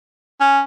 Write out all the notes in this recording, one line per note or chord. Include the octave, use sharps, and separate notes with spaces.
C#4